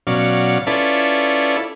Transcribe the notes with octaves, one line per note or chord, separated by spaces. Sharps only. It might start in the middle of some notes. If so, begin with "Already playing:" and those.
B2 F#3 C#4 D5 F5
C#4 E4 F4 A4 B4 D5